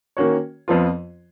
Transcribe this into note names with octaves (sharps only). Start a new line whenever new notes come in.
D#3 A#3 C#4 F#4 C#5
F2 F3 B3 F4